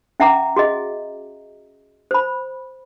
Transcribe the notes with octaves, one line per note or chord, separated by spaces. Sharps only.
C#4 E5 F#5 A#5 D6
F#4 G#4 D#5 E5
C5 B5